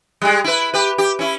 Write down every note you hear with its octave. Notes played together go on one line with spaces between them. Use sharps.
G3 G#3
E4 B4
G4 B4
G4
C#4 E4